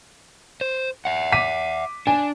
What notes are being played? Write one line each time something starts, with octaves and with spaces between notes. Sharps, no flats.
C5
E5 F#5
D6 B6 D#7
D4 G#5